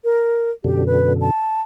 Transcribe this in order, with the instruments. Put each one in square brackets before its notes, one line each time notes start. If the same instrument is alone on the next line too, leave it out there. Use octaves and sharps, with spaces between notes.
[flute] A#4
[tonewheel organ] F#2 B2 D3 [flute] G4
[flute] B4
A5